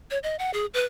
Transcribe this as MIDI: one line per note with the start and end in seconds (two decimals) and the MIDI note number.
0.11 0.18 73
0.23 0.36 75
0.39 0.51 78
0.54 0.66 68
0.74 0.84 71